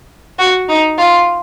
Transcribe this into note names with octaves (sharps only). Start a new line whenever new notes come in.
F#4
D#4
F4